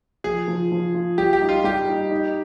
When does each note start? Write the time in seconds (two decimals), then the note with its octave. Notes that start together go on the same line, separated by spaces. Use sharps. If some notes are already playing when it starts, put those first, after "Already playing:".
0.24 F3 G#4
0.48 F3
0.72 F3
0.95 F4
1.18 G3 G4
1.33 G4
1.42 D#4
1.49 F4
1.64 G3 G4
1.88 D#4
2.11 D#4